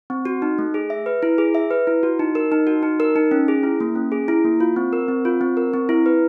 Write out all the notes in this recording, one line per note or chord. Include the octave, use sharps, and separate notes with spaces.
C4
F#4
D#4
A3
G#4
E5
B4
E4
G#4
E5
B4
E4
F#4
D#4
A#4
D#4
F#4
D#4
A#4
D#4
C#4
G#4
E4
A#3
C#4
G#4
E4
A#3
F4
C4
A#4
C4
F4
C4
A#4
C4
E4
B4